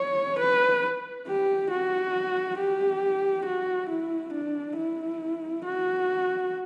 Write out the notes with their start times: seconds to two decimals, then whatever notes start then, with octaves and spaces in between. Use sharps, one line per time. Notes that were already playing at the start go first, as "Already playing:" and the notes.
Already playing: C#5
0.39 B4
1.27 G4
1.71 F#4
2.58 G4
3.46 F#4
3.90 E4
4.33 D4
4.77 E4
5.65 F#4